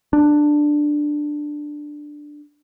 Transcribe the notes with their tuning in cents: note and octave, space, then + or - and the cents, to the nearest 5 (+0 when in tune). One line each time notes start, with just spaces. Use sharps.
D4 +10